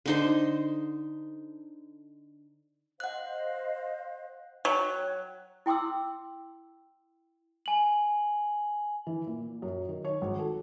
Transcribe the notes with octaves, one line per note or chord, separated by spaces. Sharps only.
D3 D#4 C5
C5 D#5 F5 F#5 F#6
F#3 C#5 G5 F#6
E4 G5 C6 D6 E6
G#5 F#7
E3
A#2
F#2
D#3
C#5
G#1
A4